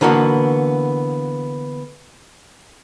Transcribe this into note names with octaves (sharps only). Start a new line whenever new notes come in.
D3 E3 A#3 B3 F#4